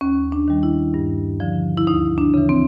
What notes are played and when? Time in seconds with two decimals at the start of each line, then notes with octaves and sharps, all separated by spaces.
0.01 D#2 C#4
0.32 D4
0.48 D#3 G3
0.63 E4
0.94 G2
1.40 D3 F3
1.78 E4
1.87 D2 D#4
2.18 D4
2.34 C#3 E3
2.49 C4